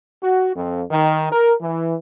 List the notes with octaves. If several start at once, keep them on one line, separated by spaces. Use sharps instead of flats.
F#4
F2
D#3
A#4
E3